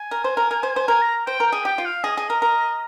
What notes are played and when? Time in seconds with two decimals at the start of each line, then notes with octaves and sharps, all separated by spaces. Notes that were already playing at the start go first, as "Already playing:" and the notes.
Already playing: G#5
0.11 A#4
0.24 C5
0.37 A#4
0.51 A#4
0.63 C5
0.76 C5
0.88 A#4 G#5
1.02 A#5
1.27 C5 G5
1.40 A#4
1.47 G5
1.52 G#4
1.65 G4 G5
1.78 F4
1.85 F5
2.03 G#4 D#5
2.17 G#4
2.30 A#4
2.42 A#4